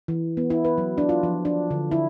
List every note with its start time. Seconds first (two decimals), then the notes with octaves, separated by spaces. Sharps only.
0.08 E3
0.37 B3
0.50 E4
0.65 B4
0.78 F#3
0.98 D4
1.09 F4
1.23 F3
1.45 D4
1.71 D3
1.91 E4